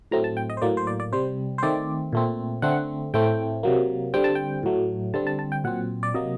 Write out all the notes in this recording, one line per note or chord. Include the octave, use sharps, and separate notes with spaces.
A2 F#3 A3 C4 A#5
A5
G5
D#5
C5
A2 F#3 A#3 D5
C5
D5
D5
C3 G3 C4 C5
C5
D#3 A3 C4 D5
A#2 A3 C4
D3 A3 C4 F#5
A2 A3 C4 G5
C3 F#3 A#3
D3 G3 C4 G5
A5
G5
A2 F#3 A3
D3 G3 C4 A5
A5
A5
G5
A#2 F#3 C4 F#5
D5
C3 F#3 A#3 D#5